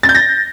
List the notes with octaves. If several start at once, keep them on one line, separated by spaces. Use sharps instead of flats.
A6
G6
A#6